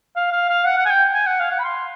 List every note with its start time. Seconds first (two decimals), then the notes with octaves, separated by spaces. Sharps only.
0.16 F5
0.32 F5
0.49 F5
0.66 F#5
0.78 F#5
0.86 G#5
0.90 G5
1.14 G#5
1.27 F#5
1.40 F5
1.51 F#5
1.59 B5
1.64 C6